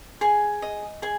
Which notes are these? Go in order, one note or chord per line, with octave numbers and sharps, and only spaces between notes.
G#4 G#5
D#5
G#4 G#5